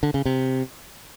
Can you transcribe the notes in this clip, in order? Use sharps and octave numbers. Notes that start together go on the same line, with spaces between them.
D3
C#3
C3